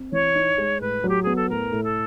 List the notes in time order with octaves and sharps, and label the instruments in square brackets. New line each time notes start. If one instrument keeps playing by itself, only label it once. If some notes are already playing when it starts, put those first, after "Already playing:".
Already playing: [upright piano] C4
[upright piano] E3 [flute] C#5
[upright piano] D#4
G#3
[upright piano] A2 [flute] B4
[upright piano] F#3 [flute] G4
[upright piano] B3 [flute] G#4
[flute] A4
[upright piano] A2 [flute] A#4
[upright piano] A2
[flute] A4